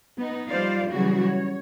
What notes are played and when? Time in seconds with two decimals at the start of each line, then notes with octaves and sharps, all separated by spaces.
0.18 B3 D#4
0.49 F3 G3 F4 C5 D5 F5
0.91 C#3 E3 F#3 G3 F#4 G#4
1.23 C#5